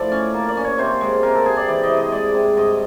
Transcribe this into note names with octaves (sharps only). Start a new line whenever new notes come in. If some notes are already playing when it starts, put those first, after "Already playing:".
Already playing: A2 F3 A4 D5
C#4
A#3
D5
C#4
C#5
C3 C5
G#3
C3 A#4
A4
C3 G#4
D5
E3 D5
D#5
C3
D#5
G#3 D5
C3
G2 D#5